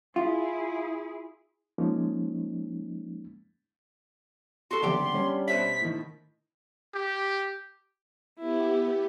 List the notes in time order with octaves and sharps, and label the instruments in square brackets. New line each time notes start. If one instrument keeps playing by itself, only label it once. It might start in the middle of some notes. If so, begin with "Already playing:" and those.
[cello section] E4 G#4 [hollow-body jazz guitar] F4
[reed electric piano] F3 G#3 A#3 C#4 D#4
[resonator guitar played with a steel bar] F#4 A4 [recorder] C6
[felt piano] F#1 D3 [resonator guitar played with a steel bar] B3 G4 G5
[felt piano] G3 C#4 D4
[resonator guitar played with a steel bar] B2 C5 E5 [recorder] B6
[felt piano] A2 D#3
[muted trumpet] G4
[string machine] B3 G4 [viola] E4